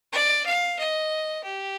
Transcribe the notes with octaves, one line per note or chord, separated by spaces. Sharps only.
D5
F5
D#5
G4